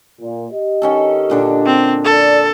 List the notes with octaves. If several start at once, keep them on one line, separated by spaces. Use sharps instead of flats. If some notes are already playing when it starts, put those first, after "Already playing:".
A#2
G4 D#5
D#3 C#4 A4
A#2 D3 D4
C4
A4 D5